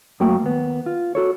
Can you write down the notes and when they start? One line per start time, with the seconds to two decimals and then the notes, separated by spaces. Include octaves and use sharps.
0.20 F#2 A3 A#3 F#4 G5
0.43 D#2 B3
0.86 F4
1.15 F#4 A4 C#5